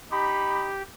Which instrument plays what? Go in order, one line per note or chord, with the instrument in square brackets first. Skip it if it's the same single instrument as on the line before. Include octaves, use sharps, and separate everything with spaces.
[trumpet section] D#4 B5 [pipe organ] G4